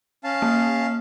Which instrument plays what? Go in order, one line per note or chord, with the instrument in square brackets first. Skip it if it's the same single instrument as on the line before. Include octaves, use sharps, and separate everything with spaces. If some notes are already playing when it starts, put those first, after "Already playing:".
[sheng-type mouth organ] C#4 F5 A5
[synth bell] A#3